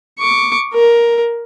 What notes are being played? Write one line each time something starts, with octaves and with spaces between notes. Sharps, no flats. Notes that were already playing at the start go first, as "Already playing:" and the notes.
C#6 D6
A#4